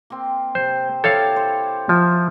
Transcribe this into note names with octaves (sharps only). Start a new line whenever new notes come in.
A#3 C4
C3 C5
E4 G4 A4 C#5 F5
C5
F3 E5